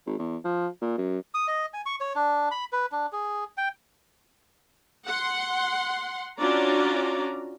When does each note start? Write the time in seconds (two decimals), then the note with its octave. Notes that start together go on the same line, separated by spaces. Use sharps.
0.07 G#1
0.19 E2
0.44 F3
0.82 A#2
0.98 F#2
1.34 D#6
1.48 D#5
1.74 G#5
1.86 C#6
2.00 C#5
2.16 D4
2.51 B5
2.73 B4
2.92 D4
3.12 G#4
3.57 G5
5.06 F#5 C6
6.39 C#4 D4 F4 F#4 D5 A#5